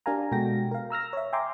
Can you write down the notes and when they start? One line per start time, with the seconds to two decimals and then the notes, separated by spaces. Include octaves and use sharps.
0.06 D4 G4 A#4 F5 G#5 A#5
0.32 B2 G#3 F#4 A4 G5 A#6
0.71 A#4 F5
0.90 A#5 E6 F6 A#6
1.13 C#5 E5
1.33 E5 G5 G#5 A#5 C6 D6